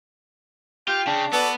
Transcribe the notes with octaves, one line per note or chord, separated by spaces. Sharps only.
F4 G4 G5
C#3 D4
B3 F#4 A4 B4 D5